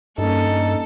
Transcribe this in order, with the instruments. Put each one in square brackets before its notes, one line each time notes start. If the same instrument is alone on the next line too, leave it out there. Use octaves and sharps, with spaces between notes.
[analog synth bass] G2 [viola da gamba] A#3 C#4 [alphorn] D#4 [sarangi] A4